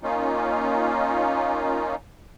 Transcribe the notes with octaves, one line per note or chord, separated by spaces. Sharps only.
A#3 C#4 D#4 F4